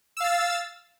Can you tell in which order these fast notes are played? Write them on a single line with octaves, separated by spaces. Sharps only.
E6 F5 A6